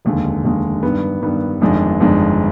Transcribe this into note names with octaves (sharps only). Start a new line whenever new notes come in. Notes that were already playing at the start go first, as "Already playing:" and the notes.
F1 D#2 D3 G#3
F1 D#2 D3 G#3
G2 D#3 B3
G2 D#3 B3
G1 F2 D#3 G#3 D4
G1 F2 D#3 G#3 D4